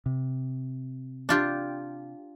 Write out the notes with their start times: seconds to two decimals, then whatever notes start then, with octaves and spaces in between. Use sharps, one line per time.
0.06 C3
1.29 D4 F4 G4